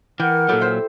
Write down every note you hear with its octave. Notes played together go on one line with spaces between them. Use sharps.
E3 A#4 F#5 G5 F6
A#2 F#3 E4 G4 A4
C5 E5